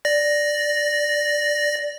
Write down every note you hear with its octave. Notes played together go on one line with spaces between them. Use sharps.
D5 A#6